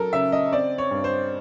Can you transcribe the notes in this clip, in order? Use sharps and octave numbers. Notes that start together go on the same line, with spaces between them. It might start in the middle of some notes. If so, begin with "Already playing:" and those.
Already playing: F#3 A4 A#4
C#3 E5
D#5
C4 D5
C#5
G2
C5